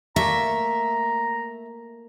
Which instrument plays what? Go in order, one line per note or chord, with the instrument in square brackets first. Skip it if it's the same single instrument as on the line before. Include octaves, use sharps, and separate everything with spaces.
[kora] A3 A#3 [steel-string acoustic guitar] E5 [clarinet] A#5